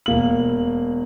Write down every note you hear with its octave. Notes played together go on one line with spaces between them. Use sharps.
E1 A#3 F#7